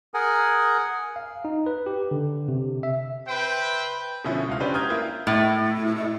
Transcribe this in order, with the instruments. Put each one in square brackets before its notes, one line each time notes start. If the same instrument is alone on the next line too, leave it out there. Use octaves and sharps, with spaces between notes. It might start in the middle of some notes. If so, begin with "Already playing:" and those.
[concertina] G#4 A#4 F#5 G#5
[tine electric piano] F5
D#4
B4
G4
D3
C3
E5
[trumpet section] B4 C5 E5 G5
[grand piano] B2 D3 F3 C#4 E4
C#2 F#4 F5
C#4 D4 G4 B4 C5 D5
A#5 D#6 F6 G6 G#6
A#3 E4 F4
[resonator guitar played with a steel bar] A2